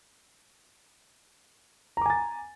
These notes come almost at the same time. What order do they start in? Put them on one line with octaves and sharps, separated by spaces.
A#5 D6 G#5 A6